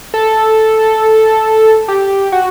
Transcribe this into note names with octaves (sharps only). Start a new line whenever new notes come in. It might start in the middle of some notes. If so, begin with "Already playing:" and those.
A4
G4
F#4